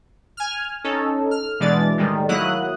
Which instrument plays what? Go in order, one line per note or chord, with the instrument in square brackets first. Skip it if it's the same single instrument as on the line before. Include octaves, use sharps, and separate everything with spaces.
[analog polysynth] G#5 F6
C#4 D#4 A4
F6
B2 E3 G#3 D4 D5 A6
A2 D#3 G3 G#3
F#3 A#3 E4 D#6 F#6